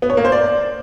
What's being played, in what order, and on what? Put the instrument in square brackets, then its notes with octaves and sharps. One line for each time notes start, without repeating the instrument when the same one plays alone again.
[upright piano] B3
C#5
A#3
C5
D5